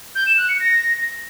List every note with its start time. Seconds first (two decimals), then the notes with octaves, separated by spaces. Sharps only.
0.15 G6
0.26 E7
0.38 F#6
0.49 C#7
0.60 A#6